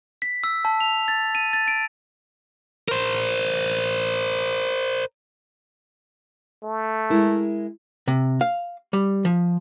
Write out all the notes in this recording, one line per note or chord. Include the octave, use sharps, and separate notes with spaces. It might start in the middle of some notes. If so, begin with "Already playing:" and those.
B6
E6
A5
F7
A6
D#7
A6
D7
A#4 C5
A3
G#3 E4 A#4
C3
F5
G3
F3